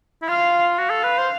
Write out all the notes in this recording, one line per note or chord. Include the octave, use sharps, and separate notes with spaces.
E4
F4 F5
F#4 F5
A4
B4
C5